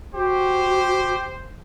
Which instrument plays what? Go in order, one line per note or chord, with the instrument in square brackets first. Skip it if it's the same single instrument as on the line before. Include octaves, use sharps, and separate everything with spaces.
[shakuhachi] F#4 [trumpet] G4 [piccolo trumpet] C5